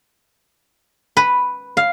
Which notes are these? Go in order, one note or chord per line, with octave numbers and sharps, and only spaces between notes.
B4
F5